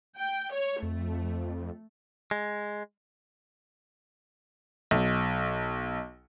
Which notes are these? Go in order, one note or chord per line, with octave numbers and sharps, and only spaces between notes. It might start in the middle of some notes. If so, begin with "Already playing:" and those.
G5
C#5
F2 A3
G#3
B1